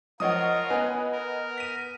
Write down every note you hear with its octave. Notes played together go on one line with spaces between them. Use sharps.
F3 F4 A#4 C#5 D#5 F#5 D#6
B3 B4 G#5
A#4
B6 D#7